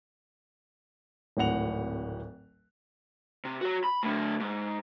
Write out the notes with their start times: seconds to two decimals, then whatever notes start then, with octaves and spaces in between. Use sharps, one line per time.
1.37 D1 G#1 A2 F#5 F7
3.45 C3
3.61 F#4 C#5
3.84 B5
4.03 A2 D3
4.40 G#2